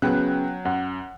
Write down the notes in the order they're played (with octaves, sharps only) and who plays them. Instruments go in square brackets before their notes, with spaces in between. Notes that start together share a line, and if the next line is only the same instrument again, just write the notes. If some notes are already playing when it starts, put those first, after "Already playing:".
[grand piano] C#3 B3 [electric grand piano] F#3 G5 F#6
[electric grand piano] F#2 [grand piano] F#5